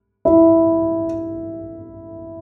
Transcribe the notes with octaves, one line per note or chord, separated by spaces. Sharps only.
E4